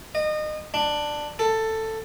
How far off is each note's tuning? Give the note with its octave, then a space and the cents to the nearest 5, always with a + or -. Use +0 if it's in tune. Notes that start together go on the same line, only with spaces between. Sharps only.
D#5 -30
D4 +10
A4 +10